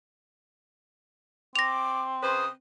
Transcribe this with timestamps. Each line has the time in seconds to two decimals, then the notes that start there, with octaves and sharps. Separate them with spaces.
1.56 C4 D6 A#6 F7
2.23 C#3 B4 C5 D#6